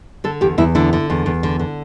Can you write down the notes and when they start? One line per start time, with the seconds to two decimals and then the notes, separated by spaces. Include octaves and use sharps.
0.24 D3 A4
0.41 E2 G4
0.58 E2 E4
0.75 D3 E4
0.93 D3
1.10 E2
1.26 E2
1.43 D3
1.59 D3